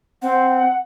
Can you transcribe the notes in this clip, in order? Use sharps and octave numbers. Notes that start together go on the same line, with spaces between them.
C4 F#5